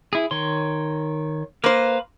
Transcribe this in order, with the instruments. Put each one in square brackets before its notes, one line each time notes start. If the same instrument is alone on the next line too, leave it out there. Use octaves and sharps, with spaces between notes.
[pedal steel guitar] E4 G#4
D#3 C#5 C6
[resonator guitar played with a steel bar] A#3 C5 [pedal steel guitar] B4 F5